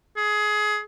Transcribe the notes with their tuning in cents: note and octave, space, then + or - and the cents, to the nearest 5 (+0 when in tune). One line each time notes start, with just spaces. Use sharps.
G#4 +20